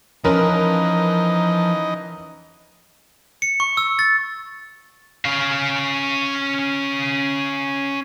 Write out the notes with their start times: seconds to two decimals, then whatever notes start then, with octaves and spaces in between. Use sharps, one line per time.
0.24 E3 F3 C#4 D#4 A#4 B4 D#5 C6
3.42 C#7
3.60 C#6
3.77 E6
3.99 A6
5.25 C#4 F5